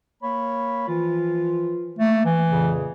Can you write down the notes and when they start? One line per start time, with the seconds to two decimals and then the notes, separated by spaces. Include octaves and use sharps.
0.22 A#3 C#5 B5
0.88 E3 F3 F4
1.99 A3 A#3
2.25 E3
2.49 F2 A#2 C#3